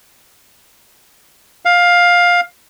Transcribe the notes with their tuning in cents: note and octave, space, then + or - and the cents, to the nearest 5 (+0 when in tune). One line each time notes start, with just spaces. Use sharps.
F5 +15